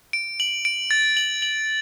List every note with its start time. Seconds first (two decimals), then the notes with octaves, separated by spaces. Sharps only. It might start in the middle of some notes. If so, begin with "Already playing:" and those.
0.13 D7
0.40 F#7
0.65 D7
0.91 A6
1.17 F#7
1.42 F#7